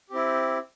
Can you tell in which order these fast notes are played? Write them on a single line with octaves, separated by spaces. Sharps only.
G4 C4 E4